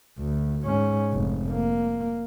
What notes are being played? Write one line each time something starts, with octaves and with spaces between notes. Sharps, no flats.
D2
G#2 C#4
F1
A#3